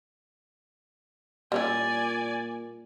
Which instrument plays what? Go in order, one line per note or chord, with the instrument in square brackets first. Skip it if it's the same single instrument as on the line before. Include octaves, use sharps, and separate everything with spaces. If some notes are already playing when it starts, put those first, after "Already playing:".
[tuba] A#2 [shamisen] G3 C#4 E4 [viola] D5 G#5